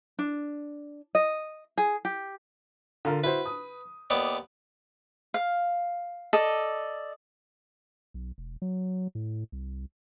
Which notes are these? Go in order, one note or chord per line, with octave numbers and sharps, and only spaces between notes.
D4
D#5
G#4
G4
D3 F4 A#4
E4 F#4 B4 C5
D#6
D#2 B3 D5
F5
A4 D5 D#5
B1
E1
F#3
A2
C2